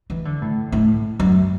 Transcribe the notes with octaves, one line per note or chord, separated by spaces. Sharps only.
E3
D3
A2
A2
F#2